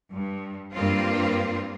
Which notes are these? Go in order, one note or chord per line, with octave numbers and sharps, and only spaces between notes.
G2
G2 A#3 C4 F4